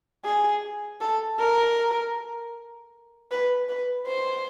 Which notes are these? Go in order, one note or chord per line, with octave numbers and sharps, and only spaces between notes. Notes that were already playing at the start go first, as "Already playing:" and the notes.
G#4
A4
A#4
B4
B4
C5